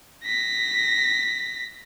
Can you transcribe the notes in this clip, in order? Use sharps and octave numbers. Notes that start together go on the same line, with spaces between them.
A#6 B6